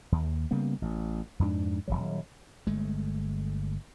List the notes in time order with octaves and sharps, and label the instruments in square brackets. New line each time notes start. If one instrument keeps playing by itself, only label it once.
[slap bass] D#2
C#3 G3 A#3 B3
A1
F2 G#2 C4 D4
D#1 C2 F#3
G1 G#3 A3